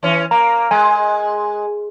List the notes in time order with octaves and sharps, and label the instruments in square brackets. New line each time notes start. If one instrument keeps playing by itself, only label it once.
[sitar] E3 C#4
[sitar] A#3 [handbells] A#5
[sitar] G#3 [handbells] G#5